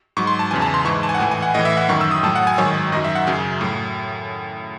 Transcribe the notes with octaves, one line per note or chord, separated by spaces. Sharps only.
G#2 F#3 C#6
C6
A5
E2 C#3 E3 G#5
A5
C6
G#2 E3 C#6
A5
G#5
F#5
A2 E3 G#5
G#5
F#5
A2 E3 D#5
E5
F#5
F#2 D#3 F#3 C#6
E6
D#6
A2 F#3 A5
F#5
G#5
G#2 D#3 F#3 C#5
F#2 D#3 F#3 D#5
E5
F#5
F#2 C#3 F#3 G#4
A2 F#3